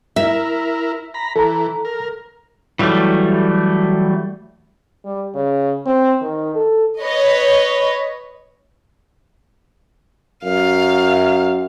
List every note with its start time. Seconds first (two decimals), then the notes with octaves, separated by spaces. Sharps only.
0.16 E4 A#4 E5
1.14 A#5 B5
1.36 E3 A4 A#5
1.85 A#4
2.79 E3 F#3 G3 A3
5.05 G3
5.35 C#3
5.86 C4
6.21 D#3
6.55 A4
7.01 B4 C#5 D#5
10.45 F#2 F5